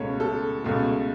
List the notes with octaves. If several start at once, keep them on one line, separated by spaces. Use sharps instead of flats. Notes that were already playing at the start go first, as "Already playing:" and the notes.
Already playing: C#2 B2 A3 C#5
A4
C#2 B2 A3